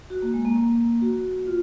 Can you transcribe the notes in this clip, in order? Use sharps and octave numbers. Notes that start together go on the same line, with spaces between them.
F#4
A#3
G#3
A#3
A#3
F#4
F4